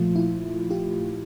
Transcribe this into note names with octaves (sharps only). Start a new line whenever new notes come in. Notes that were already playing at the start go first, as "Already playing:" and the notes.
Already playing: A#2 F3 A3 F4
E4
F4 G4